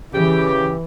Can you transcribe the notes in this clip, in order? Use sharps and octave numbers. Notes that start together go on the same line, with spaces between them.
C#3 E3 G4